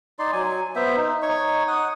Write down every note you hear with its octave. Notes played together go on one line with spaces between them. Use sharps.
D#4 D5 C6
F#3 G#5
B3 C5 E5
D#4
D#4 C#5 C#6
F#5 D#6